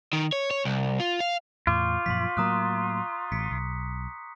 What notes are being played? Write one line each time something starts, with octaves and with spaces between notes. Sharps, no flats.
D#3
C#5
C#5
C2
F4
F5
E2 A2 F4 C#6 D6 G6
F#2 A#2 F3 C6 B6
A2 F#3 A#3 A#5 D#6 F#6
A1 B6 C#7
B1